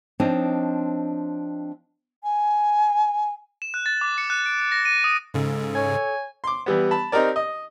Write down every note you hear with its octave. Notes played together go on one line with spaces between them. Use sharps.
F3 C4 D4 D#4 C#5 D#5
G#5
E7
F#6
A6
D6
C#7
F#6
D7
F#6
A#6
D#7
D#6
G#2 C#3 A4
C#5 G#5
C6 D6
E3 G3 B3
A5 B5
C4 D#4 G4 A#4 D5
D#5